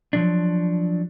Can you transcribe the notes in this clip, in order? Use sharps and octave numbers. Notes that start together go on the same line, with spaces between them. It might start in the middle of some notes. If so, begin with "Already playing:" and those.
F3 F#3 D4